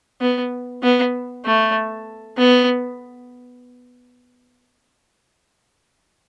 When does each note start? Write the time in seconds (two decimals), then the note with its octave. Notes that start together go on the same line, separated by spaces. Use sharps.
0.21 B3
0.83 B3
1.45 A3
2.38 B3